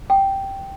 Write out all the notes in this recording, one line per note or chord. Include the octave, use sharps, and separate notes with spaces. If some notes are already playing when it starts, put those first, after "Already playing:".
G5